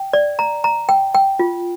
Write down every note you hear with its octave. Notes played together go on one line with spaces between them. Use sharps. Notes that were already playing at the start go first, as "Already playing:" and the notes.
Already playing: G5
D5
A#5
A#5
G5
G5
F4